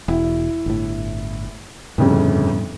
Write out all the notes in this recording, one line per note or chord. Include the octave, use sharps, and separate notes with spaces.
E1 E4
G1 A2
G1 F2 A2 C#3 G3